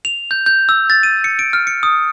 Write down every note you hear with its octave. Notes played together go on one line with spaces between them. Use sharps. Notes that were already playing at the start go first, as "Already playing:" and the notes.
F7
G6
G6
E6
A6
D#7
C#7
D7
F6
C#7
D#6